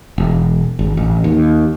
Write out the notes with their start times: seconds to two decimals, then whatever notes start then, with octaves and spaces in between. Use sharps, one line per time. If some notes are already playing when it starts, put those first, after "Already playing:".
0.18 E1
0.79 G#1
0.97 A1
1.24 D#2